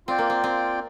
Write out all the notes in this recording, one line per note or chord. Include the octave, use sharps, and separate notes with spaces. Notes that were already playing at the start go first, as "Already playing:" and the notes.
C4 F4 D5 G5
A#3
C4
C4